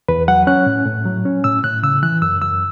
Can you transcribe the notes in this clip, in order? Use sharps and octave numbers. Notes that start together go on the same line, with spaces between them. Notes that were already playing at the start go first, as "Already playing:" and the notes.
E2 B4
F#3 F#5
C#4 F#6
A2
A2
F#3
C#4
A2 E6
A2 F#6
C#3 E6
E3 F#6
F#2 E6
F#2 E6